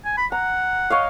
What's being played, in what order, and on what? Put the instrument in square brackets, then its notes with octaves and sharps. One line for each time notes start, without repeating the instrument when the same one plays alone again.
[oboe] G#5
B5
[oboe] F#5 [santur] A#5
[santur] C#5 D#5 F5